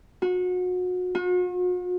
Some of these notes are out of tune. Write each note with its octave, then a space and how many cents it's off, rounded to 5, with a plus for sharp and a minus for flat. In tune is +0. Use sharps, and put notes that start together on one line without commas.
F#4 -30
F#4 -45